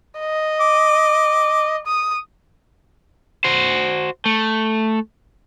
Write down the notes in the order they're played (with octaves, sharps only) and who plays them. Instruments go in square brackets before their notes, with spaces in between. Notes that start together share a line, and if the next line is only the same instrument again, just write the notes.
[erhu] D#5
[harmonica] D6
[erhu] D#6
[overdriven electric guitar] F#4 C5
A3